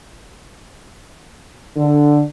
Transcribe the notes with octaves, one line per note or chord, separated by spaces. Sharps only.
D3